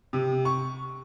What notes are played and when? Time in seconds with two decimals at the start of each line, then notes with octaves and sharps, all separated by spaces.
0.13 C3
0.45 C#6